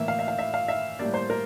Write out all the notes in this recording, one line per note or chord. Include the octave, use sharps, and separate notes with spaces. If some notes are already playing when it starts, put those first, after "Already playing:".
Already playing: A2 E3 A#3 E5
F5
E5
F5
E5
F5
E5
A2 G3 A#3 D5
C5
A#4